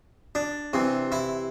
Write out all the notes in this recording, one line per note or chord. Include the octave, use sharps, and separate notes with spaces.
D4
C3 E3
E4